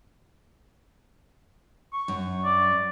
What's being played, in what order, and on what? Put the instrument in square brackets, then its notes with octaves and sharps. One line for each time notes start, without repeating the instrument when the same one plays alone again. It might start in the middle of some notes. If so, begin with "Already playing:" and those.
[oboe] C#6
[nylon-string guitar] F#2
[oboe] D5